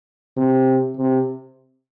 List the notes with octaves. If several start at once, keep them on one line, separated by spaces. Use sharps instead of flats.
C3
C3